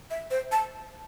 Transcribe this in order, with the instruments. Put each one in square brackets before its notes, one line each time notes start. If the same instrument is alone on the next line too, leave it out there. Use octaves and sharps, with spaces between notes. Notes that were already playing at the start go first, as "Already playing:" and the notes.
[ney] E5
C5
A5